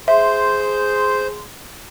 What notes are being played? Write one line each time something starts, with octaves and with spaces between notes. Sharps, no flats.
G#4 C5 E5 C6 G6